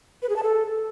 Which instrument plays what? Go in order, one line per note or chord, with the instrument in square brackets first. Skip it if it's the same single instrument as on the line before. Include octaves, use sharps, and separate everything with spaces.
[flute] B4
G#4
A5
A4